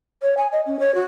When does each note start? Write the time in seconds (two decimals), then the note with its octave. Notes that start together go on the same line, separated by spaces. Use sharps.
0.22 C#5
0.37 G#5
0.52 D#5
0.65 C#4
0.79 C#5
0.94 F#4